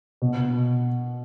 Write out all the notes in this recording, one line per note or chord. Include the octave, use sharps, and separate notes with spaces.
B2